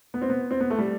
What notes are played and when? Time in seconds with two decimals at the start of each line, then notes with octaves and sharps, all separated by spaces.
0.14 B3
0.22 C4
0.29 B3
0.51 C4
0.60 B3
0.70 A3
0.78 G3